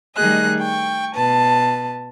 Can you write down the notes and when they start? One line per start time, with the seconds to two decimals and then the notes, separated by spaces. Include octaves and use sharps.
0.15 D#3 G3 A3 G#4 D#5 F#6
0.59 G5 C#6
1.15 B2 B4 A5